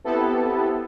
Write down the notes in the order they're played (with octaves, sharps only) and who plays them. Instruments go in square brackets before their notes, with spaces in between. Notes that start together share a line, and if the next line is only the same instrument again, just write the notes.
[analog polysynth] B3 C4 E4 G4 A4